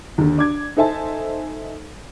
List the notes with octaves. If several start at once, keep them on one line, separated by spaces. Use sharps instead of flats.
D#2 D3
D4 D6 G#6
D#4 A4 C5 E5 G#5 A5